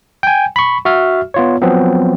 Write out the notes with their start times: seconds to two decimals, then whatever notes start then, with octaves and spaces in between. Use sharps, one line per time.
0.23 G5 G#5
0.56 B5 C#6
0.85 F#4 E5 F6
1.34 B3 F4 C#5
1.62 F3 F#3 B3 C4